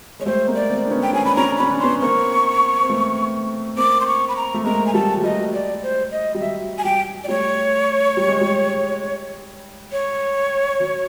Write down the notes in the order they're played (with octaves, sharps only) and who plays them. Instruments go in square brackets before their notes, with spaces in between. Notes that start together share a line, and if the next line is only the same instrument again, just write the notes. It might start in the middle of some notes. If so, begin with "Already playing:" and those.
[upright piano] G#3 [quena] C#5
[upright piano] G3 A3 [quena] C5
[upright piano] G#3 A#3
[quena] D5
[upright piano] A#3 C4
D4
B3 C#4
[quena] G5
[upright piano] C#4 [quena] G#5
[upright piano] D4 [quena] B5
[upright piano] C#4 [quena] A#5
[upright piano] D4
[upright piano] C#4 [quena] B5
[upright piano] D4
[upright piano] B3 C#4 [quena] C6
[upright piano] A#3 C4 [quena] C#6
[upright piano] C4
A3 B3
[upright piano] A#3 C4 [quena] D6
[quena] C6
C#6
B5
A#5
[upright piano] A3
[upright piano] G#3 A#3 [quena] A#5
[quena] G#5
[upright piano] G3 A3 [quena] A5
[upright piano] F#3
[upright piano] G3 [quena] D#5
[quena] D5
C5
D#5
[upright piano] G3
[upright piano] F#3 [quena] E5
[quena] G#5
[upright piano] G3 [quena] G5
[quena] D5
[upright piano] G3 A3 [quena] C#5
[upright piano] G3
G#3
G3
[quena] C#5
[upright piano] F#3